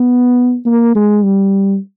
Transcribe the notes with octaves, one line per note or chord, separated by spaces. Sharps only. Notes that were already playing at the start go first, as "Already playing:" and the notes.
Already playing: B3
A#3
G#3
G3